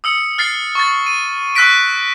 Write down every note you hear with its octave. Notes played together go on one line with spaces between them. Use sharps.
D#6 E6 C#7
F6 A6 C7
C#6 A6
D#7
C#6 E6 F#6 A#6 B6 D7